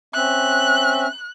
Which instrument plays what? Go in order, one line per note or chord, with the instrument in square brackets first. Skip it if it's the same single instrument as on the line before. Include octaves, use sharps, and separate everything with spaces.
[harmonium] C4 C#4 E5 [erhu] F#6